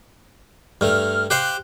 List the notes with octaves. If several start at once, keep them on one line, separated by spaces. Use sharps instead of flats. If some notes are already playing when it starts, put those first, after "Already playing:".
G2 A3 F6
G4 C5 F5 F#6